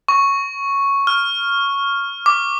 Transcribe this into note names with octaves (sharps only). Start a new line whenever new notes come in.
C#6
F6
D6